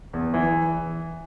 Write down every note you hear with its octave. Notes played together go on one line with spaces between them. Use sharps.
E2
E3